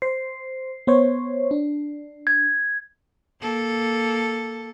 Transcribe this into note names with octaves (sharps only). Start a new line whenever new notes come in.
C5 C7
B3 C5 C#5
D4
G#6
A#3 A4